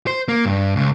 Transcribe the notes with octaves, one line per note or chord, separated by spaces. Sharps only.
C5
A#3
G2
C#2